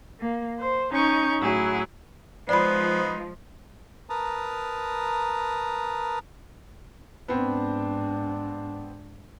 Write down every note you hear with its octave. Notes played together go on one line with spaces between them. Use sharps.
A#3
C5
C#4 D#4 C#6 G6
A2 F#3 E4 G#4
F3 G#3 B3 D#4 C5 D5 B5
A#4 B4 A5 A#5 D#6
G#2 B3 C4 D4